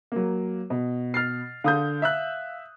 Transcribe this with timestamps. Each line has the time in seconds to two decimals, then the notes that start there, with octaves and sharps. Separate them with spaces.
0.12 F#3 A#3
0.70 B2
1.14 F6 A6 C7
1.64 D3 F5 D#6 G6
2.02 E5 E6 F#6